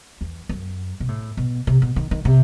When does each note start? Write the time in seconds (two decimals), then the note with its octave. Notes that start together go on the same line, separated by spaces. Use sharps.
0.21 E2
0.49 F#2
1.00 B2
1.08 A2
1.37 B2
1.67 C3
1.82 B2
1.96 D#3
2.11 D#3
2.25 C3